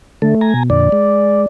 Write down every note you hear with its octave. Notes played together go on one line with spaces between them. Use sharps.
D3 A3 A4
G#5 A#5
B2
F2 A#2 D3 D5
G#3